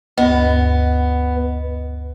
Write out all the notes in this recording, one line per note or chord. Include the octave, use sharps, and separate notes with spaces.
D2 G2 B3 D#5